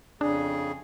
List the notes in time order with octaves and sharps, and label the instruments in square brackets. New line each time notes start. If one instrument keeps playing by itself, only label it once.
[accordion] F2 C#3 G#4 [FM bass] D4